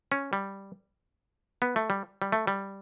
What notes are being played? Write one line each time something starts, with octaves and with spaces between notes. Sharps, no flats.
C#4
G3
B3
A3
G3
G3
A3
G3